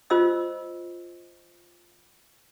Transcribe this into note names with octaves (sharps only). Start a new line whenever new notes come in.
F4 C5 D#5 E6